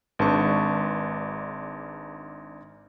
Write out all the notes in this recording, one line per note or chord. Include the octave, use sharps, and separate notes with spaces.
G#1 G#2 D4 B4 A5 C#6